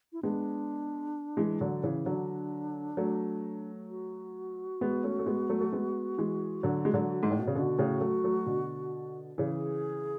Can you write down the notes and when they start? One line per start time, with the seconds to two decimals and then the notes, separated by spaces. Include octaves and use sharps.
0.13 E4
0.23 G#3 B3 D4
1.37 E3 G#3
1.61 D3 F#3
1.84 C#3 E3
2.06 D3 F#3 D4
2.97 F#3 A3
3.89 F#4
4.81 G#3 B3
5.04 A3 C#4
5.19 A3
5.26 G#3 B3
5.49 F#3 A3
5.61 A3
5.72 G#3 B3
6.18 E3 G#3
6.63 D3 F#3
6.85 G#3
6.94 D3 F#3
7.23 G#2
7.31 A2
7.39 B2
7.47 C#3
7.55 B2 D3 F#4
7.78 A2 C#3
8.01 F#3 A3
8.24 F#3 A3
8.46 B2 D3
9.38 C#3 E3 G#4